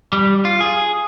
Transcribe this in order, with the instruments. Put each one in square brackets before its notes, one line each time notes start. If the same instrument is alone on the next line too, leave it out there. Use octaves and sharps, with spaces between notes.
[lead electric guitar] G3
F4
G#4